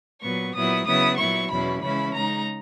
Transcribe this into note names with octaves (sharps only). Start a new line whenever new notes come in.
A#2 F#3 B3 C#6
A#2 F#3 B3 E4 D#6
C#3 F#3 B3 E4 D#6
A#2 F#3 B3 E4 C#6
E2 B2 F#3 C#4 E4 B5
C#3 E3 G#3 C#4 E4 B5
C#3 G#3 D#4 A#5